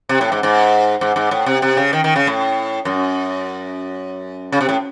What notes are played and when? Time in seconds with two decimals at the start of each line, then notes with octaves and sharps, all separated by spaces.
0.09 C3
0.21 A2
0.32 G#2
0.43 G#2
1.01 G#2
1.16 G#2
1.31 A2
1.46 C3
1.62 C3
1.77 C#3
1.93 D#3
2.04 D#3
2.16 C#3
2.27 A2
2.85 F#2
4.52 C#3
4.61 C3
4.69 A2